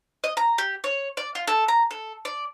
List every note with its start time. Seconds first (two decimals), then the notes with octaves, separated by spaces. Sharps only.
0.24 D#5
0.37 A#5
0.58 G4
0.84 C#5
1.17 D5
1.35 F4
1.47 A4
1.68 A#5
1.91 A4
2.25 D5